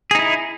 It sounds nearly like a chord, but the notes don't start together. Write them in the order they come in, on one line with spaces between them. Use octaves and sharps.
G#4 D#4 E4